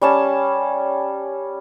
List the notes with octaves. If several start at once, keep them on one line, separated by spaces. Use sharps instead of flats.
G3 C#4 A5